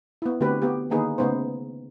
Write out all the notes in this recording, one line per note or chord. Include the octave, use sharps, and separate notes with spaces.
B3 E4
D3 A3 C4 F#4 G4 B4
B3 G4
D3 D#3 A#3 D#4 G#4 B4
C#3 A3 B3 D#4 C5